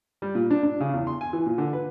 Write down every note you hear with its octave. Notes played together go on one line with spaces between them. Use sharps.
G3
A#2
D4
D4
C#3
E2
C6
G#5
E3
A#2
D3
B4